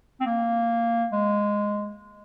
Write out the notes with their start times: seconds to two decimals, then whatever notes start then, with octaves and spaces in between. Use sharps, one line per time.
0.21 C4
0.26 A#3
1.12 G#3